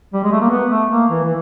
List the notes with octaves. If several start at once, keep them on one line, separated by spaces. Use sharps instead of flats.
G3
G#3
A3
A#3
B3
A3
A#3
E3
E3